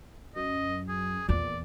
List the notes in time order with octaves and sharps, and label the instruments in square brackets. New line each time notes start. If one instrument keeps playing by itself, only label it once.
[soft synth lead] F#2 [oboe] D#5
[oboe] G#4
[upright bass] E2 [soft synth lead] A#2 [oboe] D5